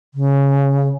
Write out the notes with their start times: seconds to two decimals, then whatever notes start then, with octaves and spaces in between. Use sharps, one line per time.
0.14 C#3